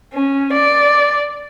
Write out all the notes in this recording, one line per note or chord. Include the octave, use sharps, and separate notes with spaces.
C#4
D5